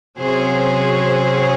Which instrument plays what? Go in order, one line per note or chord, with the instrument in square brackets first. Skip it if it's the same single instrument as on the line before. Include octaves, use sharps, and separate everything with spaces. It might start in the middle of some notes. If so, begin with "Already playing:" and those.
[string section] C3 F#3 C#4 G#4 C5